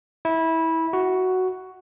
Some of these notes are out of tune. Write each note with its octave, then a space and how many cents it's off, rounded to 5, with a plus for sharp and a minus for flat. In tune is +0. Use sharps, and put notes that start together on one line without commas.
E4 -20
F#4 +5